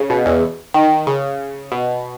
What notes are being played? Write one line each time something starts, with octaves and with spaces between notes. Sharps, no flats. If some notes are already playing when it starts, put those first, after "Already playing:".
Already playing: C#3
B2
E2
D#3
C#3
B2